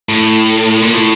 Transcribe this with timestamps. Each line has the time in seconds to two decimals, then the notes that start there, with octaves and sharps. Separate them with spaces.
0.09 A2
0.82 A#2
0.94 A2